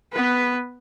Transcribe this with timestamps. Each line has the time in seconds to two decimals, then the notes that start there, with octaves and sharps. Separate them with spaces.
0.13 B3 B4